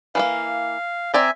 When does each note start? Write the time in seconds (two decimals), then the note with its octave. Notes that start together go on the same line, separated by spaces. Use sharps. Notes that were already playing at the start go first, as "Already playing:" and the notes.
0.15 E3 G3 A#3 F5
1.14 C4 D5 E5 G#5 A#5